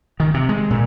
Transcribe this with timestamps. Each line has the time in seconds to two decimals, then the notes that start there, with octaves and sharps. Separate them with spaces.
0.20 D#3
0.34 C3
0.49 G#3
0.70 A#2